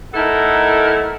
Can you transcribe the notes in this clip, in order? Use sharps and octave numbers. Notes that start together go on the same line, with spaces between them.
A3 D#4 E4 A4 A#4 F#5